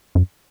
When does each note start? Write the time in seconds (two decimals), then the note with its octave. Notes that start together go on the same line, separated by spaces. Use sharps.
0.15 F#2